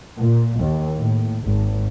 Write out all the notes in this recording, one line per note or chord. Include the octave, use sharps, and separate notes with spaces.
A#2
D#2
A2
G#1